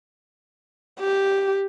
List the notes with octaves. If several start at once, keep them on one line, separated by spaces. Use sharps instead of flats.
G4